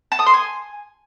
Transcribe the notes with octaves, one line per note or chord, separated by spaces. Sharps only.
A5
D#6
C6
G#5